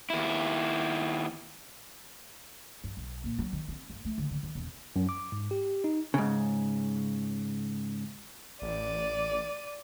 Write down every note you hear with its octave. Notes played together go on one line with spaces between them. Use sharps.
D#2 E4
G2
B1
A#2
F#3
D#3
C4
G2
A3
D3
D3
D#3
E1
F#2
D6
G#2
G4
D#4
G#2 C#3
A1 D5 D#7